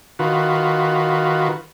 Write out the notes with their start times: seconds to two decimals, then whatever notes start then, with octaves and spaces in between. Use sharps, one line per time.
0.19 D#3 F4 F#4 B4